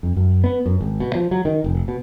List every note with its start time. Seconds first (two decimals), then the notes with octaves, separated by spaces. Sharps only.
0.03 F2
0.16 F#2
0.44 B3
0.66 F#2
0.81 G#1
1.00 B2
1.15 F3
1.31 F#3
1.45 D#3
1.64 F1
1.88 B2